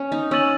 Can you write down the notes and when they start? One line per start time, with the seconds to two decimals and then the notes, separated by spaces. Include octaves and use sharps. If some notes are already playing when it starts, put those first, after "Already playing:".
Already playing: C#4
0.12 D#4
0.31 C#4 C#6 E6 A6 D#7 F#7